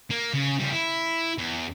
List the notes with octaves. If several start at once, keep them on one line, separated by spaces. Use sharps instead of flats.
A#3
C#3
C#3 G3
E4
E2